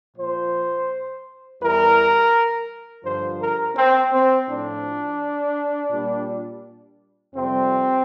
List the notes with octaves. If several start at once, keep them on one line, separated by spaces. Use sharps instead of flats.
A#2 F3 C5
E2 E3 G3 A#4
G2 D3 F3 C5
A#4
C4
C4
A2 F3 D4
A#2 G3
F2 C3 G3 C4